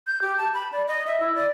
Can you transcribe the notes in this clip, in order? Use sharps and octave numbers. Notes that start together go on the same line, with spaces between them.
G6
G4
A5
B5
D5
D#5
E5
E4
D5